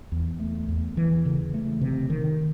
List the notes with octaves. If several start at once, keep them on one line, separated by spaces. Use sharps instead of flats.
E2
A3
E2
E3
C#3
A3
C3
D#3